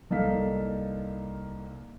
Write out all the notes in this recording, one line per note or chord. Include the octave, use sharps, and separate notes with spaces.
C2 A#3 D#4 A4 F5 B6